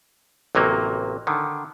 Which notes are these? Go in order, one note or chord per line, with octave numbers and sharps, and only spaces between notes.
A1 C3 F#3 A#3
D3 D#3